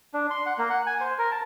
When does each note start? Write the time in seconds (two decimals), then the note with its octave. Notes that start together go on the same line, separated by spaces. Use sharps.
0.14 D4
0.30 C6
0.46 F#5
0.58 A#3
0.70 F#5
0.87 G#5
1.00 C5
1.18 A#4
1.31 A5